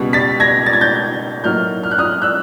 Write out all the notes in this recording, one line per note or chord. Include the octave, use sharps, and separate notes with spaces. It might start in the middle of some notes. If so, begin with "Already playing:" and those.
Already playing: C#2 B2 G3
A6 B6
G#6 A#6
A6
G#6
G6 A6
A2 F#3 A#3 D#4 F6 G6
F6
F#6
D#6 F6
E6 F#6